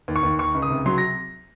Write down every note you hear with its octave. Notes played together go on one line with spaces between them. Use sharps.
D#2
C#6
D#2
D#3 C#6
C#2
D#6
C3
F#3 C6
A#6